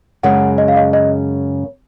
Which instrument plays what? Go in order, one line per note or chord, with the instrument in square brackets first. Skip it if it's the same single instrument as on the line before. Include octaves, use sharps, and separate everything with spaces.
[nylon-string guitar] F#2 C#3 G#3 [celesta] F#5
[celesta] D#5
F5
D#5
D#5